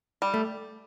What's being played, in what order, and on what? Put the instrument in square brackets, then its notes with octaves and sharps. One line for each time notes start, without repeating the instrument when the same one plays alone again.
[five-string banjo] G3
[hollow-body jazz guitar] A3